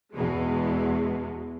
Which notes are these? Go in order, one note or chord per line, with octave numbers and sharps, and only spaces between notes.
E2 B2 G#3